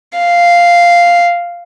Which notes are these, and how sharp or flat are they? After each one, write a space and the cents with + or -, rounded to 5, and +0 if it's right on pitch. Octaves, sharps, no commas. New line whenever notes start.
F5 -5